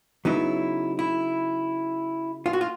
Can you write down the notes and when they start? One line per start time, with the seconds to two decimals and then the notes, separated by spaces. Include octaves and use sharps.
0.25 C#3 F#3 B3 D#4 E4
0.99 E4
2.46 F4
2.53 F#4
2.61 F4